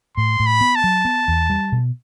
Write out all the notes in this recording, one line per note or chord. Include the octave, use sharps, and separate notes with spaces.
A2 C6
A2
B5
B3
A5
F#3
B3
E2
G3
B2